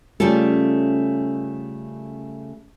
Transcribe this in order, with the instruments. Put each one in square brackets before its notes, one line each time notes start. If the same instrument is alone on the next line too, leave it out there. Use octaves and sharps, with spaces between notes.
[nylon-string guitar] C#3 G3 A3 C#4 F4 A4